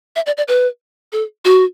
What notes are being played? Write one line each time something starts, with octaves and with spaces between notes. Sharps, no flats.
E5
D5
D5
B4
A4
F#4